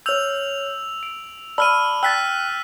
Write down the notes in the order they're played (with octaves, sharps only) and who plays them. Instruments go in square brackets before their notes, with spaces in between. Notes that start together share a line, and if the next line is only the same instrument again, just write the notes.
[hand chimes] C#5 F6 G6 [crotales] E6 F7
[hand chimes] D7
[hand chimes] D5 A5 B5 [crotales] E6 F6 D#7
[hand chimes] G5 A6 [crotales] E6 F#6 B6